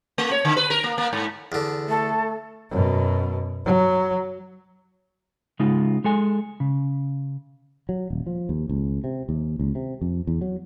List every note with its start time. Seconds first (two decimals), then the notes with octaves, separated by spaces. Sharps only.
0.18 A3
0.31 C#5
0.45 D3
0.57 B4
0.70 A#4
0.84 A#3
0.98 A#3
1.13 G#2
1.52 E2 D3
1.89 A3 A4
2.71 F#2 B2
3.65 F#3
5.59 C#3 G#3 D#4 F4
6.04 G#3 A4 G#5
6.60 C#3
7.89 F#3
8.10 D#1
8.26 F3
8.49 D#2
8.69 C#2
9.04 C3
9.29 D#2
9.59 C#2
9.75 C3
10.01 F2
10.27 E2
10.41 F#3